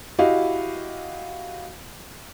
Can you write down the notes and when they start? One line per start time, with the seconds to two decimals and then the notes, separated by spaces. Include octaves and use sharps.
0.19 E4 F#4 G4 D#5 F5